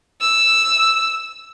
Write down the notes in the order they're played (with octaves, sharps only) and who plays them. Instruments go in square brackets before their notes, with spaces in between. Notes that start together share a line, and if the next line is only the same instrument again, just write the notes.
[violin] E6